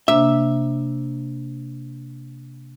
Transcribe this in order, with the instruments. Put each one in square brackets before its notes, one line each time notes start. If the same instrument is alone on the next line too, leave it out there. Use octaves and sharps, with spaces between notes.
[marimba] C3 A#3 D4 [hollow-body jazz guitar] E5